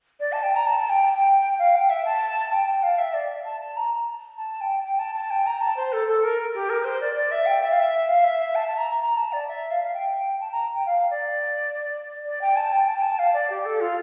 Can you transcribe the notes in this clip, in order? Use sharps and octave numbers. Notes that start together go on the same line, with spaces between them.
D5
A5
G5
A#5
A5
G5
G5
F5
G5
E5
A5
G5
G5
F5
E5
D5
A5
A5
A#5
A5
G5
G5
A5
A5
G5
A#5
A5
C5
A4
A4
A#4
G4
A#4
C5
D5
D5
E5
G5
E5
F5
E5
F5
E5
E5
A5
A5
A#5
A#5
A5
D5
E5
F5
F5
G5
A5
A#5
G5
F5
D5
D5
G5
A5
G5
A5
G5
A5
F5
D5
G4
A4
F4